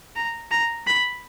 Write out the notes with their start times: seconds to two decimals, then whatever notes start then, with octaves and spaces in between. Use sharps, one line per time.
0.16 A#5
0.51 A#5
0.87 B5